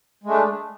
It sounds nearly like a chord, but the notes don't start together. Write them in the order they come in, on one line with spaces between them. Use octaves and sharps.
G#3 A3 D4